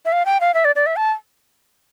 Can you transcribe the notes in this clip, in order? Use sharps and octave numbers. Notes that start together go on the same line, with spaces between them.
E5
F5
G5
F5
E5
D5
D5
E5
A5